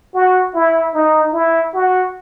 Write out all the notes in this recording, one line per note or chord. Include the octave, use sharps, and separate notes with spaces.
F#4
E4
D#4
E4
F#4